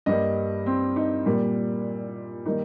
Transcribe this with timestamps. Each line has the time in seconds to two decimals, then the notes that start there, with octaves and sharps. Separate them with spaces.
0.06 G2 G3 A#3 D#5
0.66 C4
0.96 D#4
1.26 A#2 G3 A#3
2.46 D#3 G3 A#3 D#4